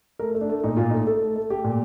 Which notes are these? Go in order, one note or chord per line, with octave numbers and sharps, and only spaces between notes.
A3 A#4
A3
D4
A3
A#2 D#4
A#2 F4
A3 D#4
A3 A4
A3
A3
A3 G4
A#2